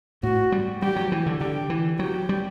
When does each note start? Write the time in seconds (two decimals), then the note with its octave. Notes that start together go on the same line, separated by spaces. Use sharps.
0.23 A2 F#4
0.52 G3
0.82 G3 G4
0.96 F#3
1.12 E3
1.26 D3
1.41 D3 G4
1.70 E3
1.99 F#3 G4
2.29 G3